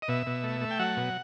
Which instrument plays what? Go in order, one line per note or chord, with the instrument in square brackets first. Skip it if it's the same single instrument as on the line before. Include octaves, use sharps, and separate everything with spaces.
[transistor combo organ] D#5
B2 E5
B2
A3
A3
G5
F#3 F#5
B2